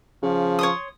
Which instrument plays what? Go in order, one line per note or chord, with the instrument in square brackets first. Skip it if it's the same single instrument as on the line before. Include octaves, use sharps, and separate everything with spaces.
[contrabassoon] C#3 [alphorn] F3
[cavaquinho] C#5 C6 D#6